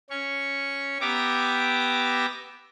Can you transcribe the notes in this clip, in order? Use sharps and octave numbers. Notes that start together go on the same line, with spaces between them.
C#4 C#6
B3 G4 E5 A#5 D6